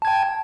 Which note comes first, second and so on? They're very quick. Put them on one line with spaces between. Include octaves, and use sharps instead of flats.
A5 G#6 G5